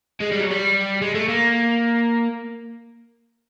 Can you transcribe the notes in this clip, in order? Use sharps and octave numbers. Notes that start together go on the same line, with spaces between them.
G#3
G3
F#3
G3
G#3
A3
A#3